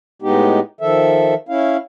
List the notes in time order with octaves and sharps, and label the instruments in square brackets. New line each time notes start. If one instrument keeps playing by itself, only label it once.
[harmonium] A2 G#3 B3 D#4 G4
D#3 F3 A4 E5
C#4 E4 F5